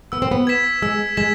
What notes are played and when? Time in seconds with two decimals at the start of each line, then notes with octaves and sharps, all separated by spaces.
0.12 B3 E6
0.22 C4
0.31 B3
0.47 G#6 B6 E7
0.82 G#3 E6
1.17 G#3 G#6 B6 E7